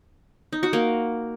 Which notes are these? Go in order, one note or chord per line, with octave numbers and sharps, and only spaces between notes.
D#4
F#4
A#3